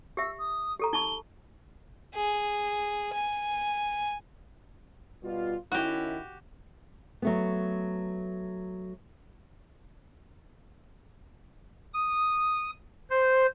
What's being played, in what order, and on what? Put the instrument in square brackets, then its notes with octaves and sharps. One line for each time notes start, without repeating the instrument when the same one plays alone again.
[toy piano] G4 E5 [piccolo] E6
[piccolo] D#6
[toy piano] G4 A4 A#5
[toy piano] D#4 A5 C#6 [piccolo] G7
[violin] G#4
G#5
[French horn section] B2 G3 F4
[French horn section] D#3 C#4 E4 [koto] F#4 G4
[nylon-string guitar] F#3 A3 B3
[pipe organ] D#6
C5